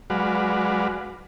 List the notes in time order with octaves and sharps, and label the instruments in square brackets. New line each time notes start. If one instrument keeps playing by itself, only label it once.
[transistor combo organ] F#3 G#3 F#4 B4 D5 F5